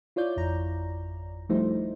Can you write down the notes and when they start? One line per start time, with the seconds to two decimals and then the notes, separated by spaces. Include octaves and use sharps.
0.16 E4 F4 C#5 D5 G6
0.36 G#1 F2 A#5
1.49 F3 G3 A3 D#4 E4 C5